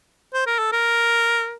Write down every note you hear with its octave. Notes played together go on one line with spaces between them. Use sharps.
C5
A#4
A4
A#4